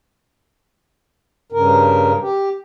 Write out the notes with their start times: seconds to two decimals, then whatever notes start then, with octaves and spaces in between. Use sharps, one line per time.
1.52 G2 C#3 A#4
2.20 G4